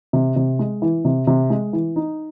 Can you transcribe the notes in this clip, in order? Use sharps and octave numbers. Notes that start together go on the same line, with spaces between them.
C3
C3
G#3
E3
C3
C3
G#3
E3
D#4